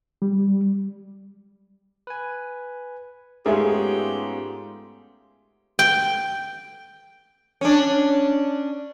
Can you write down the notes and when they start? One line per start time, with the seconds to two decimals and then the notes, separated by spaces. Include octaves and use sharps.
0.22 G3
2.07 B4 G#5
3.46 G#2 A3 B3 C#4 F4 G4 G#4 E5
5.79 G5
7.61 C#4 D4